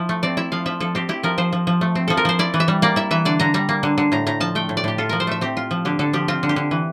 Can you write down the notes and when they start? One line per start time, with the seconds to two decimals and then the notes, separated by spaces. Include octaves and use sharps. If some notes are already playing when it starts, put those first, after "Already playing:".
Already playing: F3 E4
0.09 A3
0.23 C4 D5
0.37 E4 E5
0.52 F3 F5
0.66 F3 E5
0.80 F3 A4
0.95 C4 G4
1.09 E4 G4
1.23 F3 A#4
1.38 F3 C5
1.53 F3
1.67 F3
1.81 A3
1.95 C4
2.08 F3 A4
2.17 A#4
2.25 F3 C5
2.39 E4 D5
2.54 E3
2.60 E5
2.68 G3
2.82 A#3 D5
2.96 E4 E5
3.11 E3 E5
3.25 D3 D5
3.39 D3 A#5
3.54 G3 A#5
3.69 A#3
3.83 D3
3.98 D3
4.12 A2 A#5
4.27 A2 A#5
4.40 F3 A5
4.55 A3 G5
4.69 A2
4.77 D5
4.84 A2 G4
4.98 F4 A4
5.09 F3 A#4
5.20 C5
5.27 A3 E5
5.41 C4 G4
5.57 F4
5.71 F3
5.85 D3 G4
5.99 D3 A4
6.13 F3 G4
6.28 C4 F4
6.43 D3
6.49 G4
6.56 D3
6.71 E3